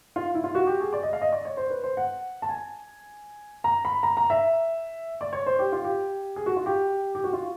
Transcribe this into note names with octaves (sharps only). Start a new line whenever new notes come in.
F4
E4
F4
F#4
G4
G#4
D5
D#5
F5
D#5
D5
C#5
C5
B4
C5
F#5
A5
G#5
A#5
B5
A#5
A#5
E5
D5
C#5
C5
G4
F4
G4
G#4
F#4
F4
G4
G4
F#4
F4